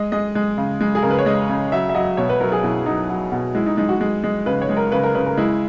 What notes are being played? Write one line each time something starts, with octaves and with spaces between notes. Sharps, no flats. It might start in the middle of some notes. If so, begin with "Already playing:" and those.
Already playing: G#3 D#5
G#3 D#5
G#3
C#3
G#3
G#4
C#3 A#4
B4
C#5
G#3 D#5
C#3
F#3 E5
E5
F#3 D#5
B2 C#5
B4
F#3 A#4
G#4
B2 E4
F#3 D#4
F#3
B2
G#3 E4
D#4
G#3 D#4
F#4
G#3
G#3
C#3 B4
C#5
G#3
A#4
C#3 B4
A#4
C#3 B4
A#4
G#3 E4